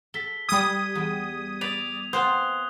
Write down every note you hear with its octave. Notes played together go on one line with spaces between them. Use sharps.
A4 B6 G7
G3 G#5 D#6 G#6 D#7
E2 G5
D5 B5 F7
B3 C4 F4 C5 D#6 F#6 G7